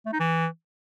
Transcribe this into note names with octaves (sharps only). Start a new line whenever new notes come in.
A3
D#4
E3